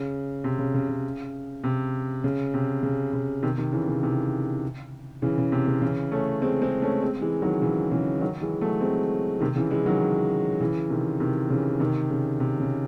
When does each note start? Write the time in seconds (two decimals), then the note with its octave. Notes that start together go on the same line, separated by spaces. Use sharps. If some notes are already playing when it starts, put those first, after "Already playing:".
Already playing: C#3
0.44 C3
0.59 C#3
0.74 C#3
0.89 C#3
1.64 C3
2.24 C#3
2.54 C3
2.83 C#3
3.13 C#3
3.43 C3 D#3
3.58 C3 D#3
3.72 C#3 E3
3.88 C#3
4.03 C3 D#3
5.22 C#3 E3
5.38 C#3
5.52 C3
5.67 C#3
5.82 C#3 E3
6.12 A3 C#4
6.42 G#3 C4
6.62 G#3 C4
6.82 A3 C#4
7.02 G#3 C4
7.21 E3 G#3
7.42 D#3 F#3
7.62 C#3 E3
7.91 C#3 E3
8.21 D#3 F#3
8.41 E3 G#3
8.61 F#3 A3
8.81 G#3 C4
9.40 C3 D#3
9.56 C#3 E3
9.71 E3 G#3
9.86 D#3 F#3
10.61 C#3 E3
10.90 C3 D#3
11.20 C3 D#3
11.50 C#3 E3
11.80 C3 D#3
12.10 C#3
12.40 C3
12.60 C#3